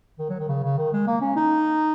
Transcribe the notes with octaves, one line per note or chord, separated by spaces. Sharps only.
D#3
F#3
D#3
C#3
C#3
D#3
G#3
A#3
C#4
D#4